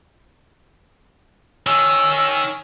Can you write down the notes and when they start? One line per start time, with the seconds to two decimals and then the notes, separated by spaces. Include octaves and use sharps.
1.67 D#3 C#4 E6